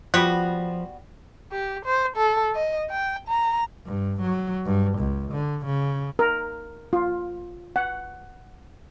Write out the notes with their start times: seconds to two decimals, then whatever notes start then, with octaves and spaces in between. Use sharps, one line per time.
0.14 F3 G3 B3 F#4
1.52 G4
1.86 C5
2.17 A4
2.55 D#5
2.90 G5
3.28 A#5
3.86 G2
4.21 F#3
4.66 G2
4.99 C#2
5.32 D3
5.66 C#3
6.19 A#4
6.93 F4
7.76 F#5